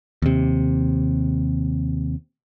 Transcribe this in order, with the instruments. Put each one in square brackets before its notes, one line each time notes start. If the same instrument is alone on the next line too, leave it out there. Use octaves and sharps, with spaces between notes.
[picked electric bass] D#2 C3